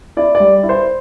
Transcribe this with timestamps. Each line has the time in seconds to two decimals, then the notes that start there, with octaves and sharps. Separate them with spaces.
0.17 E4 D5
0.35 D5
0.40 G3
0.63 E4
0.69 C5